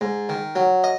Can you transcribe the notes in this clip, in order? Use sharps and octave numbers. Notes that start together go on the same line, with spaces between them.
G#2
D#3
F#3
D#5